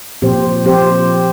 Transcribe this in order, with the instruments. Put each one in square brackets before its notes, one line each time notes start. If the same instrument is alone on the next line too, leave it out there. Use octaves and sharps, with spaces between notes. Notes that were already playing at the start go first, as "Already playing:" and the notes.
[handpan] A#2 F3 C4 G4 C5
A#2 F3 C4 G4 C5